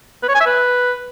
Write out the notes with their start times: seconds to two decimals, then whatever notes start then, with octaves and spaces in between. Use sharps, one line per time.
0.23 B4
0.29 C#5
0.35 G#5
0.40 E5
0.46 B4